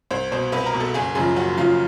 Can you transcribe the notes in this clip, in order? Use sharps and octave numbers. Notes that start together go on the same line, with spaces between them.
C2 C5
B2 C5
C2 B4
A#4
B2
A4
F#1 G#4
F#2 C#3 F3 G#4
F#1 F#4
F#2 C#3 F3 F4